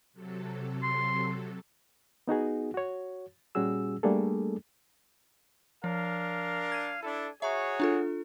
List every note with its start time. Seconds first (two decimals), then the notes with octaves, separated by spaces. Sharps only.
0.13 C3 F#3 A4
0.83 C6
2.28 B3 D#4 F#4 G#4
2.74 F#4 C#5
3.55 A#2 G3 C#4 F#4 G#4 E6
4.03 G3 A3 A#3 D4 G#4 A4
5.84 F3 D4 A#4 F5
6.72 G#6 D#7
7.03 D4 E4 A4
7.42 F#4 G#4 C#5 E5 A#5 C#6
7.80 D4 F4 A4